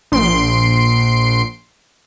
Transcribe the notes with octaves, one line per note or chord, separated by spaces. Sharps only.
A#1 C6 C7 D7